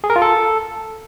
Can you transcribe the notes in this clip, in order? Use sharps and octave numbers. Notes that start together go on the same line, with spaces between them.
G#4
A#4
F4
A4